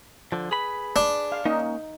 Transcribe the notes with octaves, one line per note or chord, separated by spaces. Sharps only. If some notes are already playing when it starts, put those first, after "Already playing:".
D3 F3
G#4 B4 B5
D4
F5
A#3 C#4 D#4